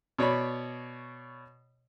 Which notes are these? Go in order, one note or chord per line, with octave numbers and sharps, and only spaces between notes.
B2 C#5 D5 B5